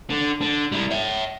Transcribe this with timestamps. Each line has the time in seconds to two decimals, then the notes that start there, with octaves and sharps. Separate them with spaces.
0.10 D3
0.41 D3
0.72 G3 E4
0.91 C#5 E5